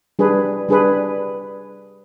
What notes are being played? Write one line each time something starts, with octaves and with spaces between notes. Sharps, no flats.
G3 D4 G#4 B4
G3 D4 G#4 B4